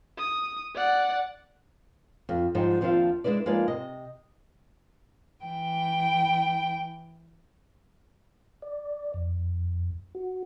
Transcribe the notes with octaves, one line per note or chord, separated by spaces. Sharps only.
D#6
D5 F#5
F2
G#2 F3 G3 G#3 D#4 G5
D#2 F3 C4 D4 E5 F5
G#3 D4 E4 B4 D5
F3 G#3 A#3 D#4 B4 D5
C3 D#5
E3 G5
D5
F2
F#4